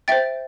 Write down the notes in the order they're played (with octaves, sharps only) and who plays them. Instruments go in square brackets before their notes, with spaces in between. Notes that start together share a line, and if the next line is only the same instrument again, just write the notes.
[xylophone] C5 E5 G5 A6